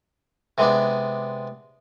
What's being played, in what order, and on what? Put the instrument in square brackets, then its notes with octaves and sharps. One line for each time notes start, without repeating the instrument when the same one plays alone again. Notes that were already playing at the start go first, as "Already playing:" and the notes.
[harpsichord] C3 G#3 B3 D4